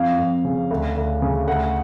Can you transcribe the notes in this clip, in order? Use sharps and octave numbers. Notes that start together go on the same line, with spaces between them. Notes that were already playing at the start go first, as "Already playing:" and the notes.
Already playing: F2 F5
F2
C#3
D2
D2
C#3
D2 F#5